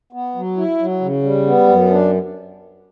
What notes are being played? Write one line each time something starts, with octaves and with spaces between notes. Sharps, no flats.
B3
F#3
E4
F#3
C#3
G3
B3
F#2
D4